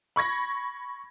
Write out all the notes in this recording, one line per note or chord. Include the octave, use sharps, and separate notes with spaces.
B5 C#6 G#6 A#6